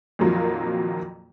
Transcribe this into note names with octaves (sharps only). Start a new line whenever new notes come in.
F2 A#2 D#3 F3 F#3 A#3